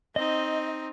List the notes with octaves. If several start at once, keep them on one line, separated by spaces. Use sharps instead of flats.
C4 D#4 D#5